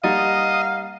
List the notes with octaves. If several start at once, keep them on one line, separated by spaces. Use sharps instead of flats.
G3 A#3 D#4 D#5 F5 F#5 A#5 A6